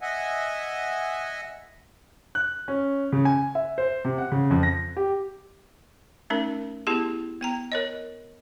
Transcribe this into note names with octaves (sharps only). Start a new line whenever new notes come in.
D#5 E5 F#5 G#5
F#6
C#4
C#3
G#5
E5
C5
C3
F#5
C#3
F2
A#6
G4
A3 C#4 D#4 A#4
B3 E4 G4 G#4 A5
B3 G5 A#5
A#4 C#5 D#5